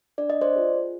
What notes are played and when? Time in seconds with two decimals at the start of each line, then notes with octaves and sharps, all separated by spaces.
0.18 D4 D5
0.30 D#5
0.41 C5 D5
0.56 F4 G#4